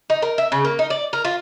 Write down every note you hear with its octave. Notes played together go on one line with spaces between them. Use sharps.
D#4
A#4
E5
C#3
A#3
D#4
D5
A#4
F4